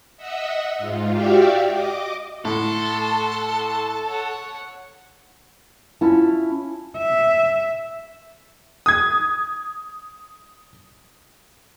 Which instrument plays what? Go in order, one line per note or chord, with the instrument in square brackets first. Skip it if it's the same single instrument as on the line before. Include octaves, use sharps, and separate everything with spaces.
[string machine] D#5 E5 F#5 E6
G#2 F4
F#4 G4 D5 E5 F5 G5
D#5 D6
[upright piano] A2 [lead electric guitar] A4 [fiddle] F#5 C6 [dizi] A5
[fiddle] C#5 F#5
[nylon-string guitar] C#4 E4 F4 A5
[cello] E5
[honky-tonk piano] D#6 G#6